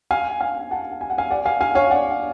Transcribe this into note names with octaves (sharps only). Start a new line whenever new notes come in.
F5 G#5
F5 G#5
F#5 A5
G#5
F#5
F5 G#5
D5 F#5
F5 G#5
F5 G#5
C#5 F5
D5 F#5